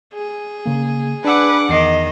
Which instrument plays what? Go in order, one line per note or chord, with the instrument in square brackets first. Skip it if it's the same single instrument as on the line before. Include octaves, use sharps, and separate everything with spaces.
[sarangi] G#4
[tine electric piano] C#3 A#3
[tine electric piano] D4 E6 [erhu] B4 [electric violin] F#5 D6
[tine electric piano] E2 C7 [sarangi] D#3 [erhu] D#5